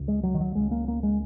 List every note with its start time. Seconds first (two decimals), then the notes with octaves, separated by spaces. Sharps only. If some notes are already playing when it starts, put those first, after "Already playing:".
Already playing: C#2 C#3
0.08 G#3
0.23 F#3
0.34 D#3
0.40 F#3
0.55 C#2 C#3 G#3
0.71 A#3
0.88 A#3
1.03 G#3